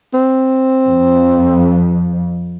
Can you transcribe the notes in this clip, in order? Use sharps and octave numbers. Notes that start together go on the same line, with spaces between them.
C4
F2